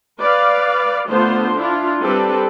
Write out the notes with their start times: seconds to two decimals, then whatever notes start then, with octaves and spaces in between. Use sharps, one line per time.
0.21 B4 D5 F5
1.10 D3 A3 B3 F4 C5
1.58 D4 E4 F4
2.02 G3 C4 D4 A4 B4